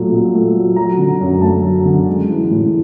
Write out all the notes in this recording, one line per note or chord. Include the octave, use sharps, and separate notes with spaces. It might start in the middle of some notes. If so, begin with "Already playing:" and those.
Already playing: A#2 F#3 A3
A#2
A3
F#3
F#3 A#5
D3
F#2
A3 A5
F#3
D3
G#3
E3
A2